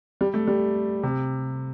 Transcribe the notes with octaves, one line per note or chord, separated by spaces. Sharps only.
G3
A3
G3
C3